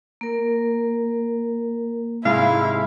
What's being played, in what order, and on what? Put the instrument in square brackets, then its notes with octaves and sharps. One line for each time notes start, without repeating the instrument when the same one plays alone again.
[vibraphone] A#3 A#4
[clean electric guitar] G#2 C3 G#3 [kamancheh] E4 [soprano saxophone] F5